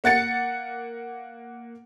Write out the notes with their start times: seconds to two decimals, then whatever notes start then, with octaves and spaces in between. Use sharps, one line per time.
0.04 A#3 F#5 A6 C#7